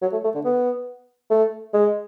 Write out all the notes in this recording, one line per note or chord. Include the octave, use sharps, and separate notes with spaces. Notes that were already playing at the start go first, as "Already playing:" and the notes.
F#3
A3
A3
D3
B3
A3
G#3